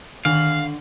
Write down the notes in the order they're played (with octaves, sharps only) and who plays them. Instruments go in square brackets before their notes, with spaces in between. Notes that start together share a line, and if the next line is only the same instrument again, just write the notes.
[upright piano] D3 [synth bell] D#3 F#7 [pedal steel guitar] F5